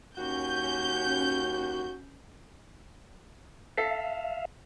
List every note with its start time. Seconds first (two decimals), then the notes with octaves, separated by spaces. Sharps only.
0.18 D#2 C#4 F#4 G6
3.78 A4 E5 F5